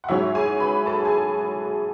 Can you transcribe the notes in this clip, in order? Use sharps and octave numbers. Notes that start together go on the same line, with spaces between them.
F#5
G#2 F#3 C#4 E4 E5
G#4 G#5
B4 B5
A4 A5
G#4 G#5